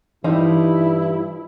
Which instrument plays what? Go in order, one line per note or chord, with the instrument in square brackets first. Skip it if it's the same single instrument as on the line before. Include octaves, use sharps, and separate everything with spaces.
[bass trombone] G2 [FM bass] E3 [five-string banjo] F3 G3 D#4 [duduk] E4